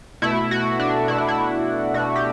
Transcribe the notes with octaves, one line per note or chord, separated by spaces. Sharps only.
B2 A3 E4
F#4
D4
B2 A3 E4
D4
E4
B2 A3 F#4
G4